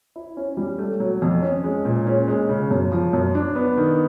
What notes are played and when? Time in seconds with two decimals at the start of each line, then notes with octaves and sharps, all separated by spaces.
0.16 E4
0.37 C#4
0.57 G3
0.78 A3
1.00 F#3
1.22 F2
1.42 C#4
1.64 G#3
1.85 A#2
2.07 C#4
2.28 G#3
2.49 C#3
2.71 F#2
2.92 F3
3.13 F#2
3.35 D4
3.55 B3
3.77 D#3